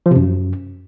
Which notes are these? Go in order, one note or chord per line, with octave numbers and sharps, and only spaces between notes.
F3
C3
F#2